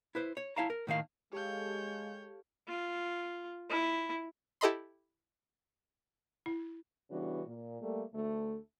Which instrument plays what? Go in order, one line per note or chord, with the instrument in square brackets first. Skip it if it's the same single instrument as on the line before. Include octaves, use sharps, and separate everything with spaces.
[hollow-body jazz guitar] E4 B4 C5
C#5
E4 C#5 F5 A5 A#5
A#4
A2 D#3 A#3 F5
[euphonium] G#3 [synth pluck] G4 A4 F5 [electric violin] C#5 G6
[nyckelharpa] F4
E4
[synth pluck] E4 G4 A4 D#5 B5 C6
[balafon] E4
[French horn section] C#3 E3 G3 B3 D4 F#4
A#2
G3 A3 A#3
D2 A3